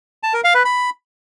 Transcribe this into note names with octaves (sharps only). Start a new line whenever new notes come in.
A5
A#4
F5
B4
B5